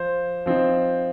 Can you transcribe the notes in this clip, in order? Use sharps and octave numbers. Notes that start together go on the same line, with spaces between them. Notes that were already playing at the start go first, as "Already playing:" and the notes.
Already playing: F3 C5
F3 C4 D#4